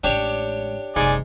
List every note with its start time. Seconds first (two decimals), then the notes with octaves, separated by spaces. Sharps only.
0.04 A1 G#3 D4 G4 C#5
0.96 F#1 G#2 C3 D5 G#5